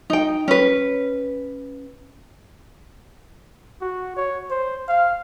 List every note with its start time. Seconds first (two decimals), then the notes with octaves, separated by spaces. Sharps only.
0.10 D#4 G5
0.48 C#4 B4
3.81 F#4
4.16 C#5
4.50 C5
4.88 F5